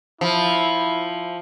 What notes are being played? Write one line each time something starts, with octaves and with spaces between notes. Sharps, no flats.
F3 E4